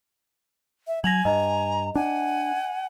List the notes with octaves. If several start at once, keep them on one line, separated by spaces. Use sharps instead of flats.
E5
F#3 G#5 G#6 A#6 F7 F#7
G2 D#5 A#5
D4 F#5 G#5